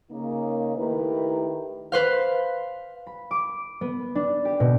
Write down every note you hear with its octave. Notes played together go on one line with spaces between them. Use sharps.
C#3 A#3 D#4
D#3 A3 E4 G4 A#4 B4
B4 C5 F5
B5
D6
B3
D4
G4
B2